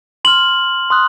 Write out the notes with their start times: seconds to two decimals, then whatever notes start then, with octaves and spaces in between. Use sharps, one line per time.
0.25 C6 F6 F#7
0.90 C6 D#6 F#6